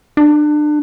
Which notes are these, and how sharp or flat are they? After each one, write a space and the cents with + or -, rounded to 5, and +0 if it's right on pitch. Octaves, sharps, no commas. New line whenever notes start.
D4 +30